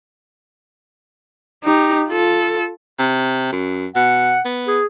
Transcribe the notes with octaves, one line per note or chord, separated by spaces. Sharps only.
D#4 G4
F4 A4
C3
F#2
B2 F#5
B3
G#4